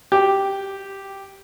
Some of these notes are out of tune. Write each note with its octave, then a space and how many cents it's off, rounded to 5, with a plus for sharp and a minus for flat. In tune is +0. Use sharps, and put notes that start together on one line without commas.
G4 +0